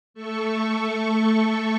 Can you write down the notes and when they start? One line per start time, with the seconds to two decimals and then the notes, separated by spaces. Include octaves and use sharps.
0.14 A3 A4 C#6